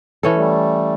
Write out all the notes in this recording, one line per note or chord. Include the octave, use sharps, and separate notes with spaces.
E3 C#4 A4
G3 A3